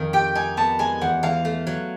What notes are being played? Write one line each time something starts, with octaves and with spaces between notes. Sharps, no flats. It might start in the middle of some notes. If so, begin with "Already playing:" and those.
Already playing: F2 D#3 D#4
G4 G5
D#4 G#5
B3 A5
G#3 G#5
E2 F#5
E3 F5
A3
F#3